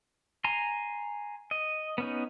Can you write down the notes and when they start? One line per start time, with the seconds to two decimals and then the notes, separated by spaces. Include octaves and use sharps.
0.44 G#5 A#5 C6
1.51 D#5
1.98 B3 C#4 D#4